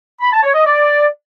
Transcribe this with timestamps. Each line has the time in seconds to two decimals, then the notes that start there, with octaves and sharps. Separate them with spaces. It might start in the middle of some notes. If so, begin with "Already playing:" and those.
0.21 B5
0.32 A5
0.43 C#5
0.54 D#5
0.66 D5